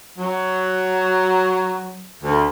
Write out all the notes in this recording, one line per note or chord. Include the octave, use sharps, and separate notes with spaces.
F#3
D2